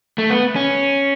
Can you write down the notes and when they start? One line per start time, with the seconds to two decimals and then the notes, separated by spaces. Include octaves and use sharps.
0.18 A3
0.30 B3
0.56 C#4